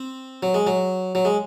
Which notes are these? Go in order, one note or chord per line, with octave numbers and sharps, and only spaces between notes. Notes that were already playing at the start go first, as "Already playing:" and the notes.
Already playing: C4
F#3
G#3
F#3
F#3
G#3